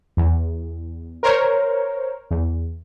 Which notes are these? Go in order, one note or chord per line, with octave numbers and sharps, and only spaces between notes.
E2
A#4 C5 C#5
E2